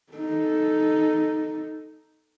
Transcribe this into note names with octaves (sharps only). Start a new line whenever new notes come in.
D#4 A4